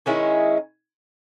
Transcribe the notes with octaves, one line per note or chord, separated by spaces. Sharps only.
D#3 G#3 C#4 E4